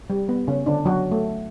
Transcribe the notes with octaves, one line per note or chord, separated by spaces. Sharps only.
G3
B3
C#3 C#4
D3 D4
F#3 F#4
A3